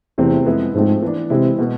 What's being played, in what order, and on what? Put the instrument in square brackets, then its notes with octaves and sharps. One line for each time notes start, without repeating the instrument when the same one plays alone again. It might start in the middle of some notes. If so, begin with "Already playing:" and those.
[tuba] E2 [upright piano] C3 E3 A3 C4
[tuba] F2 [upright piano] G#3 B3 E4
[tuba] G#2 [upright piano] F3 A3 C4
[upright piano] E3 B3 D4
[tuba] C3 [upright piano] E3 G#3 C4 E4
[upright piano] B2 G#3 B3